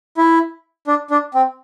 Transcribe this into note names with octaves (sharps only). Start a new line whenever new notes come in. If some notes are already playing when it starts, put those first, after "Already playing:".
E4
D4
D4
C4